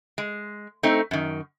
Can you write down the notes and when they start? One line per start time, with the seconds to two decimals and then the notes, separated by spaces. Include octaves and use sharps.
0.18 G#3
0.83 A3 C4 D#4
1.11 F#2 D#3